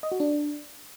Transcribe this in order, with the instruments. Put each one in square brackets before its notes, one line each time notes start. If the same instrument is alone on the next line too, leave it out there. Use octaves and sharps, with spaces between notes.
[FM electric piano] D#5
F#4
D4